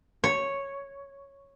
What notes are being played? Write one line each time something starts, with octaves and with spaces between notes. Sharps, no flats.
C#5